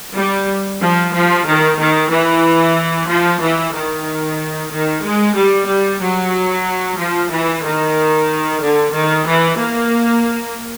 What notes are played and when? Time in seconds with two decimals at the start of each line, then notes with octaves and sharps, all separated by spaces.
0.14 G3
0.80 F3
1.13 F3
1.45 D#3
1.78 D#3
2.10 E3
3.07 F3
3.41 E3
3.73 D#3
4.71 D#3
5.03 G#3
5.35 G3
5.68 G3
6.00 F#3
6.97 F3
7.30 E3
7.63 D#3
8.61 D3
8.93 D#3
9.26 E3
9.57 A#3